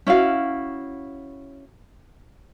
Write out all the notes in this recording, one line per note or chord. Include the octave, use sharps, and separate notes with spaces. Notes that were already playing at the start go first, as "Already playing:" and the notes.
C#4 E4 F#4 F5